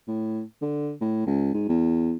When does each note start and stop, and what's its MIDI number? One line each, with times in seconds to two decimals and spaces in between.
0.07 0.41 45
0.62 0.93 50
1.01 1.22 45
1.26 1.53 37
1.53 1.65 44
1.69 2.15 40